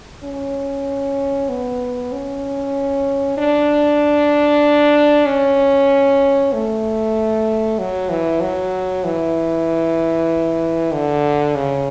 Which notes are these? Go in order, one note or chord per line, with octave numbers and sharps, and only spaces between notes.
C#4
B3
C#4
D4
C#4
A3
F#3
E3
F#3
E3
D3
C#3